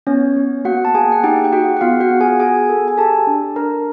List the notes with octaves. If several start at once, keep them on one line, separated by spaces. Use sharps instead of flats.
B3 C#4 C#5
B3
A#3 F#4 F#5
A5
A#3 G#4 G#5
F#5
D#4 G4 G5
G5
F#4 G#4 F#5
F#5
B3 F4 F5
F#4 F#5
B3
G#4 G#5
F#4 G#4 G#5
A4
G#5
G4 A4 A5
D4
D4 A#4 A#5